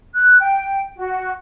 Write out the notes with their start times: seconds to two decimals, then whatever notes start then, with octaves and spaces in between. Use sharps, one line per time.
0.14 F#6
0.39 G5
0.97 F#4